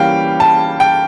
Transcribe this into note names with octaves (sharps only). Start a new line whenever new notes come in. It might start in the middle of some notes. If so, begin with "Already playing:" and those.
Already playing: E3 G3 A#3 C#4 F5 G5
A5
G5